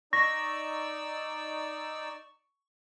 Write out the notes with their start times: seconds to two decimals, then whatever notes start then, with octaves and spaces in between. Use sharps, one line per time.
0.13 D#4 D5 C#6 E6 A#6